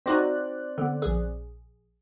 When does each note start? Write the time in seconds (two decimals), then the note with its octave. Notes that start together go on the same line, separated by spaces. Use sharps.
0.06 C4 D#4 F#4 D5 F#6 A#6
0.78 D3 B3
1.02 A#1 G#4